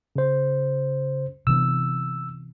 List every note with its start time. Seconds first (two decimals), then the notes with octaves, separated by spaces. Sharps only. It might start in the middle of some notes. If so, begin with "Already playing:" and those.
0.16 C#3 C5
1.47 C3 E3 B3 E6